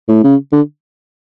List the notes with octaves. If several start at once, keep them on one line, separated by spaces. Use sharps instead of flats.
A2
C#3
D3